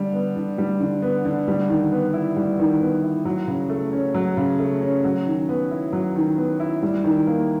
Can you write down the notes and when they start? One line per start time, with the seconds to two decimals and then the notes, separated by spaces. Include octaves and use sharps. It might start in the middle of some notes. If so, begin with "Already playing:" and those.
Already playing: D3 G3
0.13 B3
0.36 D3
0.58 G3
0.80 D3
1.02 B3
1.25 D3
1.48 G3
1.69 D#3
1.92 B3
2.13 E4
2.37 G3
2.59 D#3
2.81 B3
3.03 E4
3.25 F#3
3.47 C#3
3.69 A3
3.92 C#4
4.14 F#3
4.37 C#3
4.59 A3
4.81 C#4
5.04 F#3
5.26 D#3
5.49 B3
5.71 E4
5.93 F#3
6.15 D#3
6.38 B3
6.60 E4
6.83 G3
7.04 D#3
7.27 A#3